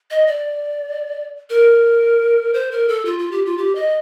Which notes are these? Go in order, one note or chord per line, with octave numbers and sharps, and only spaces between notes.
D#5
D5
A#4
C5
A#4
A4
F4
F4
G4
F4
G4
D#5